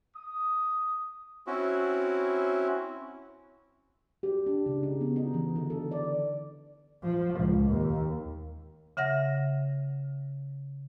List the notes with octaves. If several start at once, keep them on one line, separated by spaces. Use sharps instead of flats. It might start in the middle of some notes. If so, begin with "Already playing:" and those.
D#6
C4 C#4 E4 F#4
G4
D4
C#3
D#4
B3
D#4
E3
D3
A4
D5
F3
C#2
D#2
C#3 E5 F#5 A#6